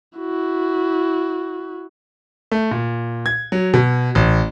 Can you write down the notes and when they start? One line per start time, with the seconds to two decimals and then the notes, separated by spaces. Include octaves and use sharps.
0.18 E4 F#4
2.52 A3
2.71 A#2
3.26 G#6
3.52 F#3
3.74 B2
4.15 A1